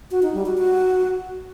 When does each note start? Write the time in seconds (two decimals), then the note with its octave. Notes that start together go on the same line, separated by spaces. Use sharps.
0.11 F#4
0.23 D#4
0.34 G3
0.46 F#4
0.57 F#4